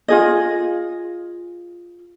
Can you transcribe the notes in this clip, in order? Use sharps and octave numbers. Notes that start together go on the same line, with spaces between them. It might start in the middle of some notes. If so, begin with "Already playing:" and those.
F4 G#4 D#5